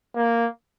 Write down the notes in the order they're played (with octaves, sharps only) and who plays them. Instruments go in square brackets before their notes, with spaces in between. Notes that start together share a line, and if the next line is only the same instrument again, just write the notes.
[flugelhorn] A#3